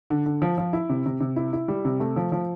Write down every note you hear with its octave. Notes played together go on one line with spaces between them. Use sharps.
D3
D3
F3
F3
E4
C3
C3
C3
E4
E4
G3
C3
A3
F3
F3